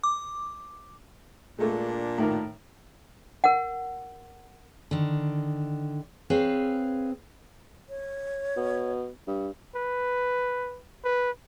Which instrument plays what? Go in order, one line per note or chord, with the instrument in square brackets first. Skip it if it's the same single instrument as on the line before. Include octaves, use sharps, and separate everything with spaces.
[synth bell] D6
[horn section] A#2 D4 [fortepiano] G#3 A3
[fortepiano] A2 D#3 A#4
[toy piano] A#4 F#5
[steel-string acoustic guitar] D3 D#3
C4 G#4 B4 C#5 F5
[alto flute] C#5
[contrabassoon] B2
G2
[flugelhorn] B4
B4